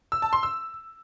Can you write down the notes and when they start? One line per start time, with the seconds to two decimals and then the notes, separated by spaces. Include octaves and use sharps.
0.12 E6
0.22 A5
0.33 C6
0.43 E6